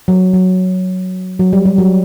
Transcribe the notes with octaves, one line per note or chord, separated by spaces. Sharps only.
F#3
F#3
F#3
G3
G3
F#3